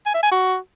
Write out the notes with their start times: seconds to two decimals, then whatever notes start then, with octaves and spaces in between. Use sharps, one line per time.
0.06 G#5
0.14 E5
0.23 G#5
0.31 F#4